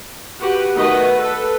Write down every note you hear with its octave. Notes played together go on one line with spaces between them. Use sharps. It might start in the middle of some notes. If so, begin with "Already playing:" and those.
F#4 G4 B4
D#3 A3 F#4 B4 D#5
A4 B4